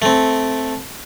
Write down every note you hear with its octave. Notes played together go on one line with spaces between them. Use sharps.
A3 C4